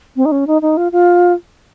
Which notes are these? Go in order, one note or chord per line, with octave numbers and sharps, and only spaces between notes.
C4
D#4
C#4
D#4
D#4
F4
F4